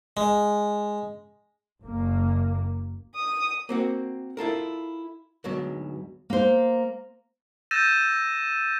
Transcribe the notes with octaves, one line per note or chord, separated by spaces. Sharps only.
G#3
F#1 A#3
D#6
A#3 C4 F#4
E4 F4 A4 A#4
D2 G#2 B2 F#3
A#3 C5
E6 G6 A6 A#6 D#7 E7